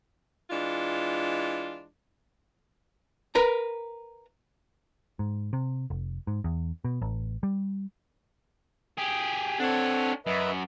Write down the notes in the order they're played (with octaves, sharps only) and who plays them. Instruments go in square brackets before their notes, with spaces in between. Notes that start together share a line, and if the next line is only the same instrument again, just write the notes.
[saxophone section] E3 G#3 D4 F4
[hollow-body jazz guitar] A#4 B4 A#5
[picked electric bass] G#2
C3
F1
G#2
E2
B2
A1
G3
[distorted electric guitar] G4 G#4
[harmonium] C4 A4 F#5 [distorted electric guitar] D4 C#5
[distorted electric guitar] F#2 [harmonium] B4 D#5 E5